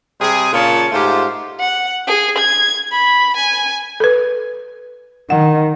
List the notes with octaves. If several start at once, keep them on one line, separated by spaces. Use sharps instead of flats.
C3 G3 G#4
A#2 C#3 F4 C#5 A5
G#2 A3 F4 G4 C5
F#5
G#4
G#6
B5
G#5
A4 B4
D#3 F#5